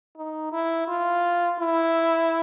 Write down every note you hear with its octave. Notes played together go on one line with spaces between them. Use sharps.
D#4
E4
F4
E4